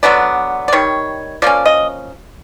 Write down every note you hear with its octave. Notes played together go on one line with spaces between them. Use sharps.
D3 F#3 B3 D5
D5
D#3 G3 C#5
F3 A#3 C#4 D5
D#5